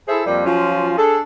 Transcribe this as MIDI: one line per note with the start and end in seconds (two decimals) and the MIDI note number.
0.08 0.26 64
0.08 0.26 68
0.08 0.26 69
0.08 0.26 72
0.08 0.26 76
0.27 0.41 41
0.27 0.41 53
0.27 0.41 55
0.27 0.41 58
0.45 0.97 53
0.45 0.97 54
0.45 0.97 61
0.45 0.97 65
0.98 1.20 62
0.98 1.20 68
0.98 1.20 69